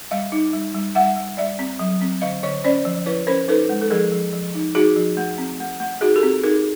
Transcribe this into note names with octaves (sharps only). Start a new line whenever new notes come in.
G3 D#5 F5
D#4
G3
G3
G3 E5 F#5
G3
G3 D5 E5
C4
F#3
C4
D3 D#5 F5
D3 C#5 D#5
C#4 C5 D5
F3
E4 B4 C#5
C#4 A#4 C5
D#4 A4 B4
G#3
A4
F3 G#4 A#4
F3
F3
D#4
D#4 F#4 G#4
F3
A3
C4
A3
A3
D#4 F#4 G#4
G4 A4
C4
D#4 G#4 A#4